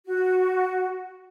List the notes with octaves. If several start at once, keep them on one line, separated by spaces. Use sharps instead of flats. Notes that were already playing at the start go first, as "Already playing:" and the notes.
F#4